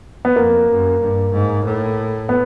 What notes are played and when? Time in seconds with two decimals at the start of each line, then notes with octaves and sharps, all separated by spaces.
0.25 B3
0.36 F2 A#3
0.69 F#2
1.00 G2
1.32 G#2
1.65 A2
2.29 B3